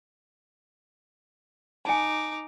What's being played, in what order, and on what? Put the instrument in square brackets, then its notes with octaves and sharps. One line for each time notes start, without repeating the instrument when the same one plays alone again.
[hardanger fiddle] D#4 D6 [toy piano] G#5 A5